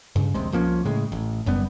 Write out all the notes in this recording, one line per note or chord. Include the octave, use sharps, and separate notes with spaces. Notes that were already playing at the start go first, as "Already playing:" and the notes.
G2 C#3
D#1 A#1 C3 G#3
C2 F3 A#3 C#4
A2 C#3 G#3
A1
F#1 F#2 G3 B3